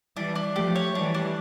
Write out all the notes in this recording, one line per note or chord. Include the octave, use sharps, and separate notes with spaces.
E3 G3 D4
D4
F3 A3 G4
C#5
E3 G3 D4
D4